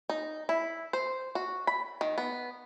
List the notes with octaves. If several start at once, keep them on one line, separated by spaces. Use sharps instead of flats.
D#4
E4
C5
F#4
B5
D#3
B3